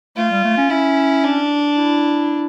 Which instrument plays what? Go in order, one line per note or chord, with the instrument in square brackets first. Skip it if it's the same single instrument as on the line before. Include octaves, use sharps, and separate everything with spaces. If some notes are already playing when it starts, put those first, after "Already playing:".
[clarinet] A3 [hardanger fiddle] F4
[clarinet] G3
A3
C#4
[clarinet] C#4 [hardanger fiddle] E4
[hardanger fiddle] D4
[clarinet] E4